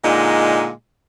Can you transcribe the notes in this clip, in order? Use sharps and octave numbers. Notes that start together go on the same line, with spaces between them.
A#2 D3 G#3 D#4